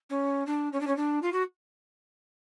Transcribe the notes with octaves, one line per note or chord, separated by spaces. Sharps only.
C#4
D4
C#4
D4
C#4
D4
F4
F#4